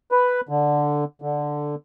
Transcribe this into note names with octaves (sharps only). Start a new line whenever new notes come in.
B4
D3
D3